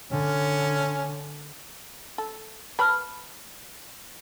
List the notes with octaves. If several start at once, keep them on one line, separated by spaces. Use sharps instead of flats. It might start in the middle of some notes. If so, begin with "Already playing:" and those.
D3 C#4
A4
B4 C#5 A5 B5 F6